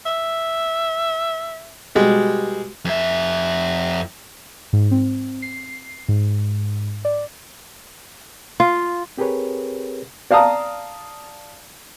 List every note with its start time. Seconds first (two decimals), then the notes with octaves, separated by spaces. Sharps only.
0.06 E5
1.95 B2 G3 G#3
2.85 F2 E5
4.73 G#2
4.91 C4
5.42 C7
6.09 G#2
7.05 D5
8.60 F4
9.18 C4 G4 G#4 A#4 B4 C#5
10.31 D5 F5 A5 A#5 D#6